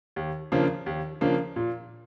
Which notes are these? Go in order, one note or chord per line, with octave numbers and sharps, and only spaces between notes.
D#2
C#3 F3 A#3 D4
D#2
C#3 F3 A#3 D4
A#2